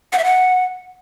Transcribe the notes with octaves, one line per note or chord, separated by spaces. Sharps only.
F#5
E5
F#5